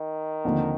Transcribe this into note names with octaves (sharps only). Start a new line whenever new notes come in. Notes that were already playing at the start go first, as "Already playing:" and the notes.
Already playing: D#3
D#2 D3 F3 C4